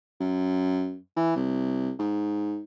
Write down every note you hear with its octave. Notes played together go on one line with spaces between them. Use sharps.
F#2
E3
C2
G#2